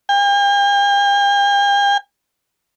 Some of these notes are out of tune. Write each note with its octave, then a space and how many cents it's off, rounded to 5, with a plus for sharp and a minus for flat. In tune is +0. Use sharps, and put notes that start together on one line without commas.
G5 +45